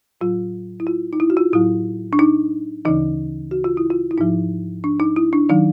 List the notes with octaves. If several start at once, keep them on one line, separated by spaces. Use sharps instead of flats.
A2 F#3 F4
E4
F4
D#4
E4
F#4
F4
A2 F#3 E4
D4
D#4
D2 C#3 E3 D#4
F#4
F4
E4
F4
E4
G#2 F3 D#4
D4
D#4
E4
D4
D#3 F#3 D#4